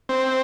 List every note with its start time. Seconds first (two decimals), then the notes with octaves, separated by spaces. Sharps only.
0.09 C4